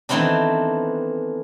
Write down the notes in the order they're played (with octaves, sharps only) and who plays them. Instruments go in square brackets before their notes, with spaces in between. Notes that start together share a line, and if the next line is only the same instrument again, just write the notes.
[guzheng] D#3 E3 A3 B3 C4 D4